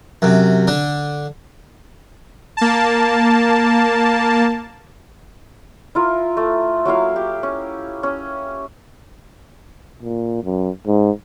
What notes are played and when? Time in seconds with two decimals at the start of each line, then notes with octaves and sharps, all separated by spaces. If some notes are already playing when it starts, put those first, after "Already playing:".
0.22 F#2 C3
0.67 D3 D4
2.57 A#3 A5
5.95 E4 F4 A#4
6.37 A3
6.85 F#3 A#3 E4 F5
7.16 G4
7.43 C#4
8.03 C#4
10.03 A#2
10.44 F#2
10.87 G#2